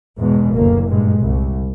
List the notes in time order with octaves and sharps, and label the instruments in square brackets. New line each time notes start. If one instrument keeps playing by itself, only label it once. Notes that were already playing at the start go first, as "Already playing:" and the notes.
[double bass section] E2 G#2 B2 G#3
F#1 D2 A#3
G2 A#2 G#3
C2